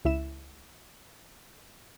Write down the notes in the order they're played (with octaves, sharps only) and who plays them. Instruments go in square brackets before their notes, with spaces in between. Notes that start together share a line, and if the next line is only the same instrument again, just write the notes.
[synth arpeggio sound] C#2 E4 E5 E7